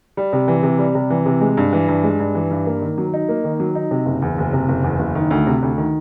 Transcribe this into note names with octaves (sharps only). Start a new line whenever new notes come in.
G3
C3
E3
C3
G3
C3
E3
C3
G#3
G2
E3
G2
G#3
G2
E3
G2
A#3
D#3
F#3
D#4
A#3
D#3
F#3
D#4
C3
F#1
E2
F#1
C3
F#1
E2
F#1
D#3
D2
C3
D2
D#3